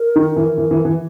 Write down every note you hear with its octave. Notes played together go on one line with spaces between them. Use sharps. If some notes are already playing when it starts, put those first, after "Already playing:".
Already playing: A#4
D#3
E3
E3
E3
E3